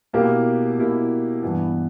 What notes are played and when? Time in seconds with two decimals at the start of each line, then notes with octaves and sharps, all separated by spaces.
0.13 B2 A#3 E4 G4
0.78 B2 A#3 E4 G4
1.43 G2 E3 B3